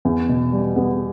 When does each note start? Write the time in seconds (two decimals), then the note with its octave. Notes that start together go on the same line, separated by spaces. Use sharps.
0.05 E2
0.29 B2
0.52 G3
0.76 B3